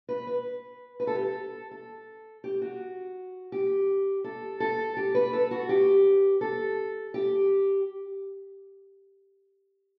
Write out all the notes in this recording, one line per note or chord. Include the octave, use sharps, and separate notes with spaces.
B4
B4
B4
A4
G4
A4
A4
G4
F#4
G4
A4
A4
G4
B4
A4
F#4
G4
A4
G4